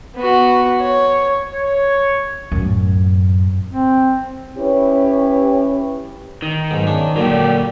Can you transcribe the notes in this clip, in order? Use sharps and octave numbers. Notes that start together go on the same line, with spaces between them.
B3 F#4
C#5
C#5
F#2 A2
C4
C#4 E4 G4 B4 C#5
D#3
B1 G#2
C#3 D4
A#2 D3 F#3 G4